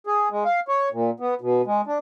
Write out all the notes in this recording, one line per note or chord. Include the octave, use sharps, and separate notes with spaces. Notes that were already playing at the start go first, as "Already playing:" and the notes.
G#4
G#3
F5
C#5
A#2
B3
B2
G#3
D4